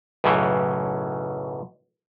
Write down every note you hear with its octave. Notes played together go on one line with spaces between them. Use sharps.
B1 F#2 A2 C#3 E3